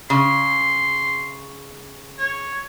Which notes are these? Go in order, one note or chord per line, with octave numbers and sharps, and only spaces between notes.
C#3 C6
C#5